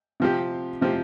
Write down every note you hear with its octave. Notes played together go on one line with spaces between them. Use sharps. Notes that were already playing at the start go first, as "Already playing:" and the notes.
C3 F3 C4 G4
C3 F3 C4 G4